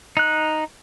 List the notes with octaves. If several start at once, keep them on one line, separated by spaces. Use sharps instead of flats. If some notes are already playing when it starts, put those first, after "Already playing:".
D#4 F#6